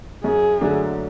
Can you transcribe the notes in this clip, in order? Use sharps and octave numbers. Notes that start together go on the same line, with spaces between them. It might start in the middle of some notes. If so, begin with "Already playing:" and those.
F#2 G#4
D3 F#3 A3 D4